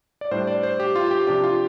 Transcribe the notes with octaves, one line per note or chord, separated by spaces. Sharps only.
D5
A2 G3 D4 C5
D5
C5
G4
F4
G4
C3 F3 D4 G4
F4